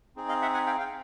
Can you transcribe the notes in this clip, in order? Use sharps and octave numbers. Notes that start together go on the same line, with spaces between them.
C4 D#4 G#4
D#5 F5
E5 F#5
F#5 G#5
F5 G5
F5 G5